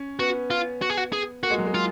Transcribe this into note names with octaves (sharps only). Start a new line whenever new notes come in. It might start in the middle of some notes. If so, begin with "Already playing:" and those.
Already playing: C#4
B3 F#4
F4
F#4
G#4
F#4
G#4
A#3 F#4
G#3
F#3
G#3
F4